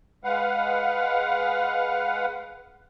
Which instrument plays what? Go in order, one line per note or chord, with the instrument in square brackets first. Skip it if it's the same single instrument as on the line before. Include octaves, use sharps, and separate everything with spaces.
[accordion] G#3 B4 F5 F#5